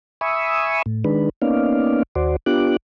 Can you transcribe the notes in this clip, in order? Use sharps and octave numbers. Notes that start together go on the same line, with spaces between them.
E5 G#5 B5 C#6 D#6 E6
A2
D#3 G#3 D4 B4
A#3 B3 C#4 D#4 D5 F5
D#2 F#4 C5 D5
B3 D4 F4 G4 D6 F#6